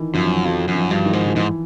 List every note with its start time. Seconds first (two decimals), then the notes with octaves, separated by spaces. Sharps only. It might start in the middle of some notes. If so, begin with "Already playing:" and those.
Already playing: D#3 E3
0.14 F#2 F3
0.45 F2 F#3
0.68 F#2
0.75 F3
0.91 G2
1.05 D#3
1.13 G#2
1.27 F3
1.36 G#2 E3